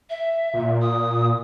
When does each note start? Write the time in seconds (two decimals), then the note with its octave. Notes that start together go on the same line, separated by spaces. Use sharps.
0.10 E5
0.54 A#2
0.82 D#6